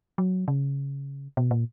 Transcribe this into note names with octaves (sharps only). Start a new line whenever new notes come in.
F#3
C#3
B2
A#2